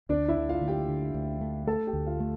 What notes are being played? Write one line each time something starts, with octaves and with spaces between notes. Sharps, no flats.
D2 D4 D5
E4 E5
D3
F4 F5
D2
G4 G5
D3
D2
A3
A3 A4 A5
G4 G5
D2
F4 F5
A3